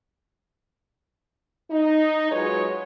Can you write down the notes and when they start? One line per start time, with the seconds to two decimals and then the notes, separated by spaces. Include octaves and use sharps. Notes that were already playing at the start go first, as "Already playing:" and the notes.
1.71 D#4
2.31 F#3 G#3 F4 B4 C#5